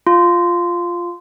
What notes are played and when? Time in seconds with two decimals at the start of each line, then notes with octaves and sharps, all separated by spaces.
0.07 F4